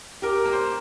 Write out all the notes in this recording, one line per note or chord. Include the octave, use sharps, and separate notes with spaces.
G4 A#4
A#4
A#3
C5